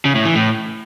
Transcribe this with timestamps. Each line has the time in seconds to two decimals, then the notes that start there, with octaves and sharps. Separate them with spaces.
0.05 C#3
0.15 A2
0.25 E3
0.35 A2